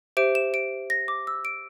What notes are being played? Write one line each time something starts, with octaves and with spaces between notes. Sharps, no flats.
G4 C5 E5 D7
E7
D7
A#6
D6
E6
D7